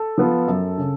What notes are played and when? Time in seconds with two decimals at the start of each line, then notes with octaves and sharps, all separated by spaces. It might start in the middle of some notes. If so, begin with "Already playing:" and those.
Already playing: A4
0.18 F3 B3 F4
0.48 F#2
0.78 C#3